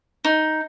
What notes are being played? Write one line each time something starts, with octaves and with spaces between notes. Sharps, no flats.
D#4